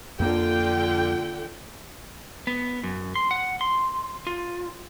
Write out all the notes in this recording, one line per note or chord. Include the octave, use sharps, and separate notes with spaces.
F2 D3 A#3 F4 G5
B3
F#2
C6
F#5
C6
F4